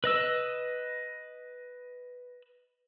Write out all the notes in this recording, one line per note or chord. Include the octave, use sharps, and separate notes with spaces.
B4 D#5 E6